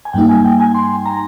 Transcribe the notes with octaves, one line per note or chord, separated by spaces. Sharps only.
G#5
G2 G3 A#3 D#4 G5
G#5
G5
G#5
C6
A#5